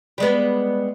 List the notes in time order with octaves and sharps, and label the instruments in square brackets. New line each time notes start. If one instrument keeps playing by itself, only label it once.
[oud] G3 G#3 B3